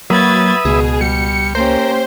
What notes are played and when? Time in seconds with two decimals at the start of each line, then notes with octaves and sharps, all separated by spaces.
0.10 F#3 A#3 B4 E5 B5 D#6 G#6 A6
0.65 C#2 B2 G#4
1.01 G3 C#7
1.55 A#3 C#4 G4 A#4 C5